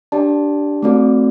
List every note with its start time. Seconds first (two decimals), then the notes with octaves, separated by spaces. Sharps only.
0.12 D4 G4 D5 A5
0.83 A3 C4 F#4 A4 D5